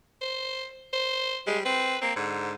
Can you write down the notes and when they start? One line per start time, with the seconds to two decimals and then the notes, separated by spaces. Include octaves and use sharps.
0.22 C5
0.93 C5
1.47 G3 G#3
1.65 C4 B4
2.02 A#3 C4
2.16 G#2 D3